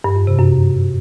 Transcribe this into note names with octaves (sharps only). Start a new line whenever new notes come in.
G2
F2
C3
F#2